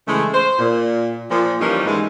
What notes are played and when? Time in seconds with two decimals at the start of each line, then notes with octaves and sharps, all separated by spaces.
0.07 C#3 E3 G#3 A3
0.33 C5
0.59 A#2
1.30 A#2 F3
1.60 E3 F3 G3 A#3 C#4 D#4
1.86 G#2 E3 G#3